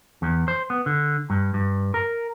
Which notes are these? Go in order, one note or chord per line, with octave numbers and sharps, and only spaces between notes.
E2
C5
B3
D3
G2
G2
A#4